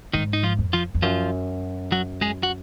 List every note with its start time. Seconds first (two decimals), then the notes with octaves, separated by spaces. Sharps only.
0.13 G#2 D#3 D#4
0.33 D#4
0.43 F3 F4
0.59 F2
0.73 F3 F4
0.95 F2
1.02 F#2 F3 F4
1.92 F#3 F#4
2.21 G#3 G#4
2.43 F#4